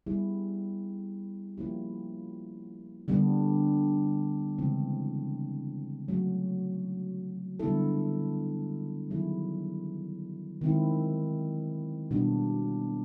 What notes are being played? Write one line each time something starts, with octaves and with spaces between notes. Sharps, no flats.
G3 B3 E4 G#4
F3 A#3 C#4 E4 G4
D3 G3 B3 D4
C#3 E3 G#3 C4 E4
F#3 A3 C#4 F#4
D3 G3 B3 E4 A4
D#3 F#3 B3 E4 G#4
D#3 G#3 C4 E4
B2 G3 B3 D4